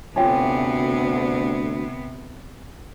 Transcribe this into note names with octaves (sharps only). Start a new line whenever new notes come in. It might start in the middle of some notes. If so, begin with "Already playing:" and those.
D2 C3 B3 C#4 F4 G4